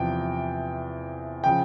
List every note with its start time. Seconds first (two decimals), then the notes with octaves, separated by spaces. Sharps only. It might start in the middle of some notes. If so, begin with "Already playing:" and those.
Already playing: E2 C3 F3 G5
1.44 C#3 F3 G5